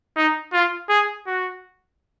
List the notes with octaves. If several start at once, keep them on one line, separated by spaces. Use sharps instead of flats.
D#4
F4
G#4
F#4